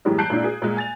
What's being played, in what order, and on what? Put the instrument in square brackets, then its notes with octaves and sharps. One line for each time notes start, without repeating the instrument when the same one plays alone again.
[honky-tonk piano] F#2 A2 E3 G3 G#3 A#3
A5 F#6 G6 C7 D7 F#7
A#2 G#3 D4 E4
G#4
A#2 G#3
G#5 A6 F7